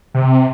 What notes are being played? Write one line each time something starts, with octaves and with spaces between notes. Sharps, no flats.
C3